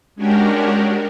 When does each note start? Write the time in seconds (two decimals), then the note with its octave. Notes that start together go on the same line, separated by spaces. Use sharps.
0.15 G#3 C#4 D4 F#4 G4 A#4